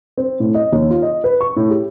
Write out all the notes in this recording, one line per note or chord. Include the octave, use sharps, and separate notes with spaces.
C4
A2
D#5
D#2
F4
D#5
B4
C#6
A2
G4